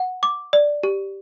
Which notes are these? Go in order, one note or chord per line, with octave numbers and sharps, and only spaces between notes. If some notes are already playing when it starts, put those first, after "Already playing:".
Already playing: F#5
D6
D5
G4